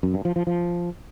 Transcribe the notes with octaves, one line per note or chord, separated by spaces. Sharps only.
F#2
G2
F3
F3
F3